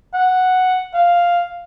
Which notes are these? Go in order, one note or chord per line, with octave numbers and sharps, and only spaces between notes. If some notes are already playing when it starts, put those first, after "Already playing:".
F#5
F5